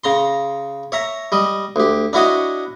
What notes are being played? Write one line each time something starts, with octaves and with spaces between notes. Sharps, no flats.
C#3 A#5 C6
C#5 E5 A#5
G3 D#5
D2 G4
D4 E4 F#4 C#5 D#5